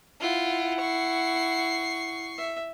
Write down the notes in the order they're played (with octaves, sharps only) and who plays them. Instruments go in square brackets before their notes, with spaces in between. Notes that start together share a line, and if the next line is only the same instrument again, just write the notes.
[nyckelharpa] E4 F#5 [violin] F4
[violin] C#6 C7
[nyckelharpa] E5